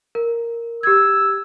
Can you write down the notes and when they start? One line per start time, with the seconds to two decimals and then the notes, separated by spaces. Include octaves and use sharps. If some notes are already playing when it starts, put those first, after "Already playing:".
0.15 A#4
0.83 G4 E6 G#6